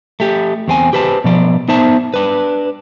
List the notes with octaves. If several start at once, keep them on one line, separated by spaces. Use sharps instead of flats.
A3 G4
E2 C4 G#5
G4 B4 C5 A5
B2 F3 D5
B3 D#4 C5 E5 A5
D4 B4